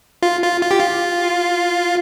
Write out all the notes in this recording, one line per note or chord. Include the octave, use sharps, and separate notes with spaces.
F4
F4
F4
G4
F4